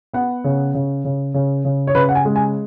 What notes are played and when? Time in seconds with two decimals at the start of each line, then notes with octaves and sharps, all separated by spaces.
0.14 B3 F#5
0.44 C#3
0.74 C#3
1.05 C#3
1.34 C#3
1.65 C#3
1.87 C#5
1.95 C#3 B4
2.09 F#5
2.15 G#5
2.25 G#3
2.36 G#5